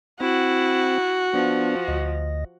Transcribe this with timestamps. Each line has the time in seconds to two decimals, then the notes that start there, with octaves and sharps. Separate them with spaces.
0.20 C4 E4 F#4
1.34 F3 B3 D4
1.88 D2 D#5